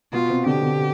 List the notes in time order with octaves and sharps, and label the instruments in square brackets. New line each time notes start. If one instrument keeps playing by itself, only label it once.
[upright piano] B2 B3 [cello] F4
[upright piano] C3 C4
[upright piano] D3 D4 [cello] G4
[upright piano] D3 D4